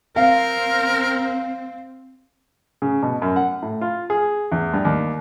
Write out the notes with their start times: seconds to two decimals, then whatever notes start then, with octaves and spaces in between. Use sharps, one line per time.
0.16 C4 A#4 F5
2.82 C#3
3.03 B2
3.22 F#2
3.36 F#5
3.62 A2
3.81 F4
4.10 G#4
4.52 E2
4.74 G2
4.85 D#2